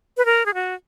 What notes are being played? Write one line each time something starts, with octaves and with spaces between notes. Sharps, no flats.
B4
A#4
G#4
F#4